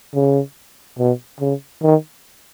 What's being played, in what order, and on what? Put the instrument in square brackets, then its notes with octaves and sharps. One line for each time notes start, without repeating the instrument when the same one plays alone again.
[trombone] C#3
B2
C#3
D#3